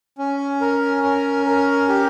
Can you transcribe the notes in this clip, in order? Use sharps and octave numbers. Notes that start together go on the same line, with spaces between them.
C#4
A#4
C#4
A#4
G4